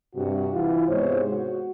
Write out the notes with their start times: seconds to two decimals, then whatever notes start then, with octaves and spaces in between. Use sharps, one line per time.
0.15 G2 C3 F#4
0.53 E3 E4 F4
0.88 G#2 C3 G#3 B3 C5 C#5
1.30 F#4